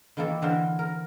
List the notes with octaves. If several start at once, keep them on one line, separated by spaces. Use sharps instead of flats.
D#3 E3 A#3 E4 A4
D3 E3 A#4 C5
A#4